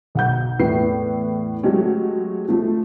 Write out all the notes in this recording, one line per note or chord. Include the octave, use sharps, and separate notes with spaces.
B1 F#5 G6
E2 A2 E4 B4 C7
F#3 G#3 A3 C#4 G4
F3 A3